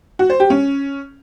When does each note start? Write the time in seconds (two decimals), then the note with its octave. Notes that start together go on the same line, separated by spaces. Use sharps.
0.19 F#4
0.30 C5
0.40 G4
0.50 C#4